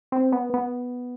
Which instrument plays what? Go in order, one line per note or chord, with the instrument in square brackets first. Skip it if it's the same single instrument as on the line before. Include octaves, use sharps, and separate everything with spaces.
[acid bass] C4
B3
B3